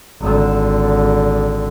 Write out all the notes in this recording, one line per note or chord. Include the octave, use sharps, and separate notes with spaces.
G#1 D3